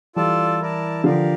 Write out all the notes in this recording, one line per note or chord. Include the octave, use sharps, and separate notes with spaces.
E3 G3 F4 A4 D5 A5
E4 A#4 D5 A5
D3 F3 G4 A#4 D5 F5